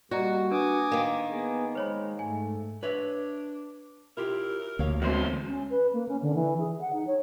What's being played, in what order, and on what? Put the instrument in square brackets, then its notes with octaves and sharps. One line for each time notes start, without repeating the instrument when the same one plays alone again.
[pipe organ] G3 A#3 [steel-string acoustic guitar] F#4 [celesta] D5 D#5 A#5
[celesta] D4 B4 [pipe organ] G#5 D6 D#6
[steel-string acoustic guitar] D#3 A#3
[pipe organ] B3 G#4
[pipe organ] G#3 [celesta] C5 C#5 B5
[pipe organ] G#2 A3 [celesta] G#5
[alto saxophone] D4 [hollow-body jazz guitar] B4 C#5 E5
[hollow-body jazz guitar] E4 F4 G4 [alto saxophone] A#4
[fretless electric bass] D2 [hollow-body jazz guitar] A#3 C#5 F5
[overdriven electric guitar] E2 C5 [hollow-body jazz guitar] G#3 C4 F#4
[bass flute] C#4
B4
A#3
C#4
D3
E3
G#4
F#5
D#4
C#5